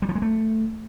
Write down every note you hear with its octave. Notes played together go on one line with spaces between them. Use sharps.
G3
F3
G#3
A3